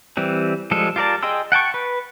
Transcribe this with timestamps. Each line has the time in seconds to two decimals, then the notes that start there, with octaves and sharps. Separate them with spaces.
0.17 E3 G3 C4
0.71 F3 G3 G#3 A4
0.96 F4 G4 A#4 D5 A5
1.23 G#4 D#5 G5 C6 E6
1.52 F#5 G5 A5 C#6
1.74 B4